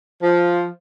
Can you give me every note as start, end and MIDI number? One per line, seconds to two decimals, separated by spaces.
0.22 0.66 53